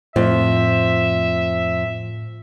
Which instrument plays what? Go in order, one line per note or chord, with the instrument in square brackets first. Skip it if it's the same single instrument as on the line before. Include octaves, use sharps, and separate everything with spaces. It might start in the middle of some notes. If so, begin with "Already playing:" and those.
[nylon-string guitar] F2 [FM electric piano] A2 [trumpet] E5